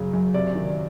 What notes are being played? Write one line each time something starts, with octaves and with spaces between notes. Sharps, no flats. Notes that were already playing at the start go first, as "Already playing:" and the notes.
Already playing: F#2 C#3
F#2
C3 D5
D#3